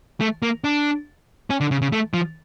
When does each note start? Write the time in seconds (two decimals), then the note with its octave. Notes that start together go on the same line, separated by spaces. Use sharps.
0.21 A3
0.42 A#3
0.64 D4
1.50 C#4
1.61 D3
1.71 C#3
1.82 C#3
1.93 A3
2.14 F3